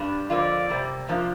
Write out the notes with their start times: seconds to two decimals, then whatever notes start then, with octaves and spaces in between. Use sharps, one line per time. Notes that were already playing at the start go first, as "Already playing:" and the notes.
Already playing: G2 G3 D4
0.30 F2 D3 A#3 F4 D5
0.69 C3 G3 A#3
1.08 C3 F3 A#3 D4 F4